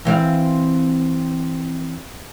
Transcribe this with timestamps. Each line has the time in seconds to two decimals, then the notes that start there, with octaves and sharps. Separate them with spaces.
0.05 E3 C4 F5